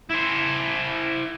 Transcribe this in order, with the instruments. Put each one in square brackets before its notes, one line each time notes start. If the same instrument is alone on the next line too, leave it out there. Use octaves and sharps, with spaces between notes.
[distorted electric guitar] E4 C5